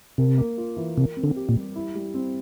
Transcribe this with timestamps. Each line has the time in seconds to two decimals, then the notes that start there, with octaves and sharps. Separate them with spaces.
0.18 C3 A#4
0.38 A#3
0.58 F4
0.77 E3
0.97 C3 A#4
1.17 C4
1.24 D3
1.36 G4
1.49 A#2
1.56 G3
1.75 E4
1.95 G3
2.14 C4